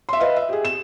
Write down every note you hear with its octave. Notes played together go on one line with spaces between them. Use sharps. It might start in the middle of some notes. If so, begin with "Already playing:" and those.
E5 C6
B4 D#5 F5
E5
G4 G#4
E7